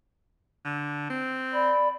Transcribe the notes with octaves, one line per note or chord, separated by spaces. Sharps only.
D3
C4
D5 B5